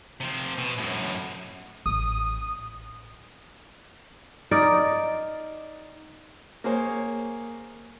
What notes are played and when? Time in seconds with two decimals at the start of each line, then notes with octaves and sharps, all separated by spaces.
0.20 C3 F3
0.58 B2
0.78 F#2 A2
1.86 A1 D#6
4.51 D#4 A#4 D5
6.64 A#3 G#4 C5 C#5